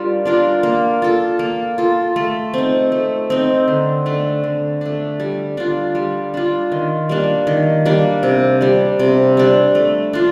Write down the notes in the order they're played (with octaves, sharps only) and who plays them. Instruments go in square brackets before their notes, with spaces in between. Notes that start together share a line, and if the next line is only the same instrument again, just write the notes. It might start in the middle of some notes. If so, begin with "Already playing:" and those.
Already playing: [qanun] G3 D4 F4 A#4
D4 F4 A#4
A#3
F4 A4
A#3
F4 A4
A3
C4 D#4
A3
C4 D#4
D3
A3 D4
D3
A3 D4
G3
D4 F4
G3
D4 F4
D#3
G3 A#3 D4
D#3
G3 A#3 D4
C3
G3 D4
C3
G3 D4
A3
D4 F4